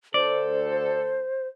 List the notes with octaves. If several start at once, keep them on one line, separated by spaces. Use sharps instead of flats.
D2 A4 C5 D5